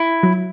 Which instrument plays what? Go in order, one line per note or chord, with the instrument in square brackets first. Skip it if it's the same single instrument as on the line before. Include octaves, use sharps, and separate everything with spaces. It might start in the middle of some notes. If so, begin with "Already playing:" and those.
Already playing: [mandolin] E4
[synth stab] F#3